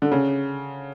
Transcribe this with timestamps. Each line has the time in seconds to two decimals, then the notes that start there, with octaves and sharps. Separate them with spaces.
0.02 D3
0.12 C#3